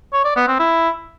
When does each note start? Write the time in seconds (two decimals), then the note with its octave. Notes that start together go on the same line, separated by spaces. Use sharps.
0.13 C#5
0.25 D5
0.36 B3
0.48 C4
0.60 E4